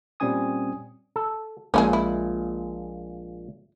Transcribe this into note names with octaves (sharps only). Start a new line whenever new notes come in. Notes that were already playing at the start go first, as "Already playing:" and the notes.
A#2 G3 C4 C#4 G#5 D#6
A4
A#1 A#2 G#3 C#4 E4 G#4
E4